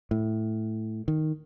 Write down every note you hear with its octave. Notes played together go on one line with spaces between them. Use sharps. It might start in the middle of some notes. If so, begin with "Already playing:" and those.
A2
D#3